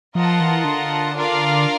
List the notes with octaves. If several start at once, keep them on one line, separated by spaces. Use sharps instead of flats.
F3 F4 A#4 D#5 F#5 A5
E3
D3
D4 F4 A#4 D5 F5